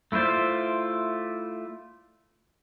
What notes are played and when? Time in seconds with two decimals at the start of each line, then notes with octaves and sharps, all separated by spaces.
0.12 A3 E4 F4 C5 D5